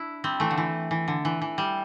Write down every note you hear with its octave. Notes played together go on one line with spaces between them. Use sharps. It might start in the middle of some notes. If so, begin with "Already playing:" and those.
Already playing: D4 E4
G3 C4
E3 A3
D3
E3
E3
D3
E3
E3
G3